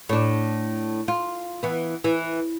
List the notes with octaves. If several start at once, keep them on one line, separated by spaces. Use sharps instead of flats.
A2 D4
F4
E3 B3
E3